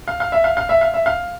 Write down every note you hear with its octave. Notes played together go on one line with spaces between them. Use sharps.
F5
F5
E5
F5
F5
E5
F5
E5
F5